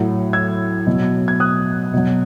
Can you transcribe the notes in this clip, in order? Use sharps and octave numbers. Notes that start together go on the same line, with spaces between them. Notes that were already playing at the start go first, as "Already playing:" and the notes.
Already playing: A2 F#3
E6 G#6
B2 F#3
G#6
D#6 F#6
B2 F#3